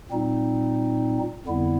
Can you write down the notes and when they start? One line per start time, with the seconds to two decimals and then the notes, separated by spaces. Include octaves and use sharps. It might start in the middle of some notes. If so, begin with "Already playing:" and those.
0.11 A#2 G3 C4 D#4
1.46 F2 D3 G3 B3 E4